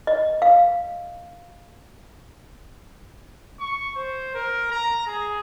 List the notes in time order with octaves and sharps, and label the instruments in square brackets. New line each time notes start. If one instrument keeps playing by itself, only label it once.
[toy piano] D#5
F5
[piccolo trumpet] C#6
C5
A#4
A#5
G#4